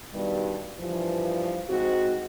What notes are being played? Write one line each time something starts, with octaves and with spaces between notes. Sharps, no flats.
G2 B2 D#3 G3
G2 E3 F3
G#2 C4 F#4